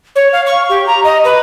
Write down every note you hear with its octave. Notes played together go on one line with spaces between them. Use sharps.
C#5
F5
C#6
G4
A#5
D#5
B4